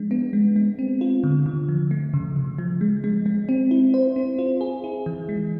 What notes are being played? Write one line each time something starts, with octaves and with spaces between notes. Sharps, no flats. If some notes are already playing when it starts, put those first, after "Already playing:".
Already playing: F3 G#3 D4
B3
G#3
G#3
C4
F4
D3
D3
F3
A3
C#3
C#3
F3
G#3
G#3
G#3
C4
E4
C5
C4
F4
G#4
E4
E3
G#3